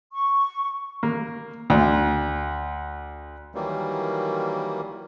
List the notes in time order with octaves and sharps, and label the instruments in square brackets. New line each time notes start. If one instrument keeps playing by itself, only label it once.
[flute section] C#6
[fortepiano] A#3
D2
[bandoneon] D#3 E3 F#3 G3 A#3